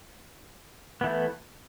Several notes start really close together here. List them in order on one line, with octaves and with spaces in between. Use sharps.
B3 E3 A3